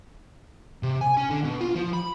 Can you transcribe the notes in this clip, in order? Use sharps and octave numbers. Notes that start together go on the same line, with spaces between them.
C3
G#5
C#4
D3
B2
F4
F3
B5